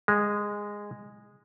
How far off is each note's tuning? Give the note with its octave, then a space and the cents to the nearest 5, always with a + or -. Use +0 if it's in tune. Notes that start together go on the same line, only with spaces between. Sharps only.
G#3 -10